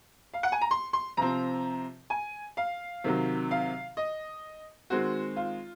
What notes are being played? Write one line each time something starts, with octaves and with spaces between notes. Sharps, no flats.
F5
F#5
G#5
A#5
C6
C6
C3 F3 C4 A#5
G#5
F5
C3 D#3 F#3
F5
D#5
D#3 G#3 C4 F#4
F4